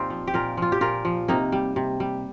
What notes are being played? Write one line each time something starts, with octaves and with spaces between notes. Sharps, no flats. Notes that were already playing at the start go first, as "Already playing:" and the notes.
Already playing: A#2 C4 D#4 F4 G4
F3
G4
A#2 F4 A#4
F3 F4
G4
A#2 F4 A#4
F3
C3 A#3 D#4
G3
C3
G3